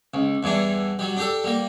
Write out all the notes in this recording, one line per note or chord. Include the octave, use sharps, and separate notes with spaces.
C#2
E2 G2 E3 D4
F#3 G3
D4 G4 A4
G3 A#3